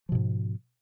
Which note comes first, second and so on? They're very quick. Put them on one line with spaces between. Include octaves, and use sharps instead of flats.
F3 B2 G#2